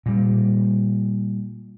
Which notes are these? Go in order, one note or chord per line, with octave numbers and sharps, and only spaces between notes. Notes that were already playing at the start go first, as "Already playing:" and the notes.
A#2 G3